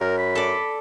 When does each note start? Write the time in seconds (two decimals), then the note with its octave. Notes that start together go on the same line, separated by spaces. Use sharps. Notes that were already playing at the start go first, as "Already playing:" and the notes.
0.01 F#2 A#4
0.18 B5
0.35 A4 D5